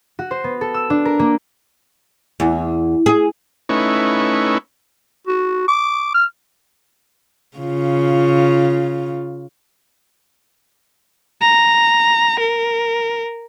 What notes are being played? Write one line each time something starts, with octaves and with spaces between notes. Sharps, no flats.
F#4
C5
B3
A4
E6
D4
A#4
A#3
E2
G#4
A3 C#4 D#4 E4 B4 C#6
F#4
D6
F6
C#3 F4
A#5
A#4